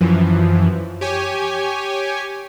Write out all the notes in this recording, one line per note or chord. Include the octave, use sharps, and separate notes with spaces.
F#2 E3 F3
G4 C#5 G#5